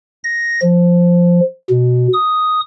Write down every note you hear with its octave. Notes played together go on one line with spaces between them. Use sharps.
A#6
F3
B2
D#6